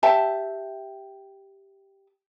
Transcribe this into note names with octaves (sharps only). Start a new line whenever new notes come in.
G4 E5 A5